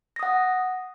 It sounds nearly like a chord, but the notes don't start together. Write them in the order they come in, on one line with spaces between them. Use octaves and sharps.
A#6 D#6 F#5